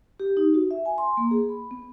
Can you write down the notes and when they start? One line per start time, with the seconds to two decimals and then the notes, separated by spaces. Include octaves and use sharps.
0.20 G4
0.37 D#4
0.54 F#4
0.71 E5
0.86 G#5
0.98 C6
1.17 A#3
1.31 G#4
1.49 B5
1.71 B3